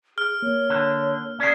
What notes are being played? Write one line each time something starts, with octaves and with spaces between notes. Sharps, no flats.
G#4 F6
A#3 C#5
D3
C#4 G#4 D5